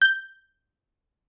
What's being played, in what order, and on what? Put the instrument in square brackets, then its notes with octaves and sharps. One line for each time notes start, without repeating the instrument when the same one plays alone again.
[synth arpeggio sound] G6